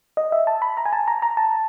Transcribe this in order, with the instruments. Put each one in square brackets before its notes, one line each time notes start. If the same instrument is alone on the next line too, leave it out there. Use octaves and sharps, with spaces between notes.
[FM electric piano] D#5
E5
A5
B5
A#5
G#5
A5
A#5
A#5
A5